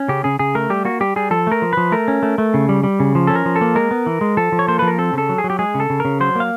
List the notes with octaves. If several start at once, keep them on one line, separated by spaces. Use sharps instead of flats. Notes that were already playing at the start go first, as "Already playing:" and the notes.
Already playing: C#4
C#3 G4
C#3 G#4
C#3 G#4
A3 A#4
G3 G4
A#3 F#4
G3 G4
G3 G#4
F3 A4
A3 A#4
F3
F3 B4
A3 A#4
C#4
A3
A3
C#3
G3
G3
C#3
F3
C#4 A4
A#4
F3
A4
A#3
G#3 A#4
B3
E3
G#3
F3 A4
F3
C#5
A#3 C5
F3 B4
A#4
C4 A4
C#3 A4
F#3
G#4
F#3
G4
G#3 G#4
C#3
A4
C#3
C#3 A#4
F#3 C5
A#3 F5